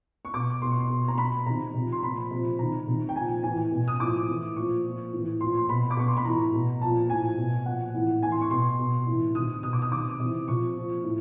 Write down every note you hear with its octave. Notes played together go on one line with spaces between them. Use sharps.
C#6
B2 D6
B2 C6
C#6
C6
B2
A#5
B2 B5
C3 D#3 A#5
C3 F3
C6
A#2 F3 B5
C3 F3
C3 D#3 A#5
C3 D#3
G5
A#2 F3 G#5
A2 E3 G#5
B2
D#6
A2 F3 D6
A2 E3
A#2 F3 C#6
A#2 F3
A2 E3
A#2 F3 C6
C6
B2 B5
D6
B2 C#6
C6
B5
A2 E3 A#5
B2
A#2 F3 A5
A2 F3 G#5
B2
A#2 F3 F#5
A2 E3
A2 E3 G#5
C6
C#6
B2 C6
B2
A2 E3
C3 D#3 D#6
B2 D#6
D6
D#6
C3 D#3 D6
C3 E3
C3 F3 C#6
A#2 F3
A2